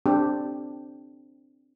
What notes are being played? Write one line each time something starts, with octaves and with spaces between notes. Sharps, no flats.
C4 D4 G4